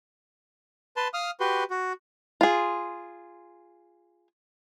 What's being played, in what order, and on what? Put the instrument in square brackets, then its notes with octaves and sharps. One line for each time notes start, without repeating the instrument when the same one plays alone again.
[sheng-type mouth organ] B4 A5 C6
F5 D#6 F6
F#4 G4 B4 C6
F#4
[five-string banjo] F4 G#4